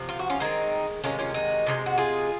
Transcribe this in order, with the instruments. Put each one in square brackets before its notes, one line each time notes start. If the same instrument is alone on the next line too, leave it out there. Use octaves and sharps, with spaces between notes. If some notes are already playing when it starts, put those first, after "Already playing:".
Already playing: [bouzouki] C3 F3
F4
F#4
C#4 F4
D#3 G#3 C4 D#4
C3 D#3 G#3 C#4 F4
C#4 F4
D#4 F#4
C3 D#3 G#3
F#4
F4 G#4